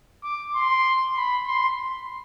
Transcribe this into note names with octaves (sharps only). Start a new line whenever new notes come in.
D6
C6
B5
C6